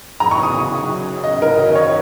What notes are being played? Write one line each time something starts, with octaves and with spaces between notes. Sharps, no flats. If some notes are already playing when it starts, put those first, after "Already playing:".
F#2 C#3 F#3 A#5
C#6
D#6
D#5
A#4
F#2 D#3 F#3 C#4 D#5
C#5